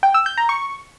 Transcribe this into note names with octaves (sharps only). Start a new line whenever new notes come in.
G5
E6
G6
A#5
C#6